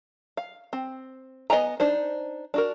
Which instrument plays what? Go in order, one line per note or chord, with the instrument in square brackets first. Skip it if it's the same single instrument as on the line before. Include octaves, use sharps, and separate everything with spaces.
[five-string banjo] F5
C4
B3 D#5 F#5 G#5 A#5
D4 D#4 C5
D4 F#4 A#4